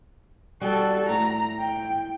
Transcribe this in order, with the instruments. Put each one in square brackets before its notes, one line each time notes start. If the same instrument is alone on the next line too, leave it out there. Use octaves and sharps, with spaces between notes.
[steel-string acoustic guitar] G3 [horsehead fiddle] F#4 A4
[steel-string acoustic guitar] A2 [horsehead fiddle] A#5
[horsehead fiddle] G5